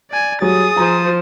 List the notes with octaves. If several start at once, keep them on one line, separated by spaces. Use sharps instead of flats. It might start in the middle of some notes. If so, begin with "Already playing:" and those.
D5 G#5
F#3 G3 G#4 D#6 A6
F3 C5 A#5